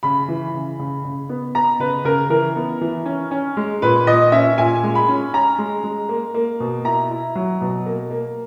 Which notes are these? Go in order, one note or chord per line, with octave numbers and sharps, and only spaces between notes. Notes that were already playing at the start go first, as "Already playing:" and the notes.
C#3 B5
E3
C#3
C#3
C#3
B3
B3 A#5
C#3 B4
C#3 A#4
E3 A#4
B3
E3
C#4
C#4
G#3
A#2 B4
A#2 D#5
C#4 E5
A#2 G#5
G#3
B5
C#4
C#4 A#5
G#3
G#3
A#3
A#3
B2
E4 A#5
E4
F#3
B2
A#3
A#3